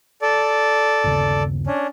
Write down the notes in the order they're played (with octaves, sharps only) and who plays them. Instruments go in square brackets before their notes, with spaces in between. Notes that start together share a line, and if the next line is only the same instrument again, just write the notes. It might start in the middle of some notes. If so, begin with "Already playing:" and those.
[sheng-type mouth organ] A4 D5
[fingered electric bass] G1 D#2 C#3
[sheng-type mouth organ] C#4 D4